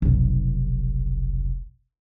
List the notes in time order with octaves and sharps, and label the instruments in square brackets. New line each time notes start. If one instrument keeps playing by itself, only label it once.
[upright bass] F1 B1